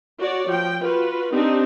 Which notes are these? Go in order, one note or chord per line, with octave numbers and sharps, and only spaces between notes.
F#4 C#5 D5
F3 G5
F4 F#4 B4
C4 D4 D#4 G4